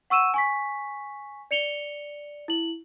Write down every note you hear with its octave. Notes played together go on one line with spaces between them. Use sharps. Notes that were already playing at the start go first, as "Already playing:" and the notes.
F#5 C#6 E6 D#7 E7
G#5 C#6 B6
D5 C#7 F7 G7
E4 F#7